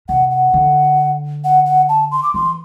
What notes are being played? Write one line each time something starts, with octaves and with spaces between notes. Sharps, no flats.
C3 F#5
F#5
D3
F#5
F#5
A5
C6
D6
E3 C6